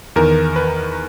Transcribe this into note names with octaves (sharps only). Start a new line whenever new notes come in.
E2 D#3 A#4
B4